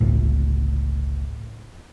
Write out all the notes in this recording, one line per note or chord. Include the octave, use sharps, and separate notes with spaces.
G1 C#2 A2